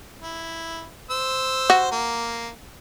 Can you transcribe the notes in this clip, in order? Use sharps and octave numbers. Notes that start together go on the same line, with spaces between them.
E4
C5 E6
F#4
A#3